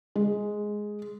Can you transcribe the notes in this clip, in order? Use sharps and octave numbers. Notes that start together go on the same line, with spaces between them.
G#3